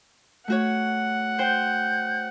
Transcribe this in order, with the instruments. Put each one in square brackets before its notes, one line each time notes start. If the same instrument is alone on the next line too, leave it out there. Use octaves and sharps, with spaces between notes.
[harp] A3 F#4 C#5 [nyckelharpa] F#5
[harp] C5 G5 [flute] G6